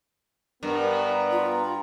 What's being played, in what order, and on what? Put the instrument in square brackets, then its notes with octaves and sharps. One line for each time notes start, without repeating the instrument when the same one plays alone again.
[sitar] G2 [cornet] B3 [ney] A#4 [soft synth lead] A#5
[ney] F4